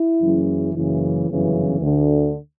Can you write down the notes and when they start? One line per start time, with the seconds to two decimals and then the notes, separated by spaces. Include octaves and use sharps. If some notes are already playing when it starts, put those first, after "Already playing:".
Already playing: E4
0.21 F#1 F#2 C#3 E3
0.74 F#1 F#2 C#3 E3
1.27 G1 F#2 C#3 E3
1.81 D2 D3